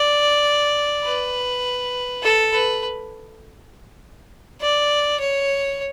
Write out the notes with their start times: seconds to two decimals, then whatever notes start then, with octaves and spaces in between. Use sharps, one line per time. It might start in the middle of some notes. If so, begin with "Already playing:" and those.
Already playing: D5
1.05 B4
2.23 A4
2.53 B4
4.61 D5
5.20 C#5